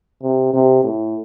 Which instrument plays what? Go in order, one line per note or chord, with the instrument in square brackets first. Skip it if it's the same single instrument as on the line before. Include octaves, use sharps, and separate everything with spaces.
[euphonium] C3
C3
A2